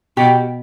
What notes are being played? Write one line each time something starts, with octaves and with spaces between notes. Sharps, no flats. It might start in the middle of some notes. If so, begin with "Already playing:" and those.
B2 G4